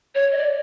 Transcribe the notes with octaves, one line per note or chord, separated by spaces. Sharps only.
C#5
D#5
D5